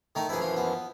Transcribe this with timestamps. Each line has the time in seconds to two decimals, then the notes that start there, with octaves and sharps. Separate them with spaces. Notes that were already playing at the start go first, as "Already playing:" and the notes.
0.15 D#3 A3 D#4
0.29 F#2 E3 F3 E4 G#4
0.41 F4
0.57 B3